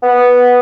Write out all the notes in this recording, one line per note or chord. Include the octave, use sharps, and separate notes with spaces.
B3